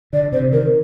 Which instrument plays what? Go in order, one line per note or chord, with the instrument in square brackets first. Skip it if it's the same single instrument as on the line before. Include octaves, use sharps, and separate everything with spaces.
[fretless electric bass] D3 [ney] D5
[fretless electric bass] C3 [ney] C5
[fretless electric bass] D#3 [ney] A#4